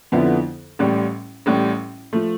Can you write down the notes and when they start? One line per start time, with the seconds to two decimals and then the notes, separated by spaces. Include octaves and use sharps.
0.12 F2 D3 F3 B3 E4
0.79 A1 A2 G3
1.46 A1 A2 G3
2.13 F3 A3